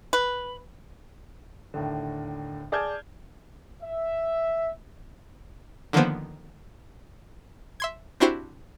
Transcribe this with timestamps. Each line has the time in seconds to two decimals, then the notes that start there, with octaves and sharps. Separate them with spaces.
0.13 B4
1.74 D#2 A2 D3
2.72 G#4 D5 A5 F6 G6 G#6
3.83 E5
5.93 D3 D#3 F3 A#3 B3 C5
7.80 E5 C6 G#6
8.20 C4 D4 E4 F#4 G4 C5